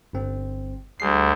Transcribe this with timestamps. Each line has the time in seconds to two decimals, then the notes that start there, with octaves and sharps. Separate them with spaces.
0.13 G1 C4
1.00 D2 G3 G#4 C7